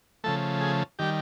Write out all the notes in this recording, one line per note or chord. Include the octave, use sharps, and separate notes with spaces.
C#3 F3 A3 A4
G#4
D#3 G3 G4